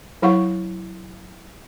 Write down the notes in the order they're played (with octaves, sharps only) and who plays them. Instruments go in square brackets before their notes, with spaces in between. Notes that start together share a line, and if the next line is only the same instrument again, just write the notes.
[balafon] F#3 E4 F5 F#5 C#6